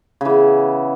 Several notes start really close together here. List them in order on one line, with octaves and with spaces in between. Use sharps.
C#3 E3 B3